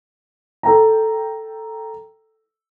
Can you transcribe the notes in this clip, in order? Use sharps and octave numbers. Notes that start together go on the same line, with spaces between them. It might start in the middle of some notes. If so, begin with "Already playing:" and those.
A4 G5 A#5